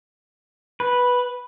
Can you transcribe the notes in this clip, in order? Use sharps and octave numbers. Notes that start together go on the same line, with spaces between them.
B4